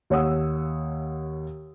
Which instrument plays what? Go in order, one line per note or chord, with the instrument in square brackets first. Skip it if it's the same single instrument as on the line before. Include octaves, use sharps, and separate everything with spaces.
[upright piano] D#2 C#5 F#5 D#6 E6